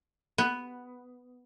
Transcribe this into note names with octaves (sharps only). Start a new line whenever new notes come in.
B3